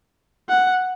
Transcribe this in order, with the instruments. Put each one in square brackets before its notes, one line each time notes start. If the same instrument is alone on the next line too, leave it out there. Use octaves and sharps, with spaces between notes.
[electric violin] F#5